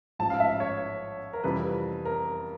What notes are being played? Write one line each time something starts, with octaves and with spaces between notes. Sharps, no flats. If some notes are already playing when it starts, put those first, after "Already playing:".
A1 G#2 F3 A5
F5
E5
C#5
A#4
F2 C3 E3 G3 B4
A#4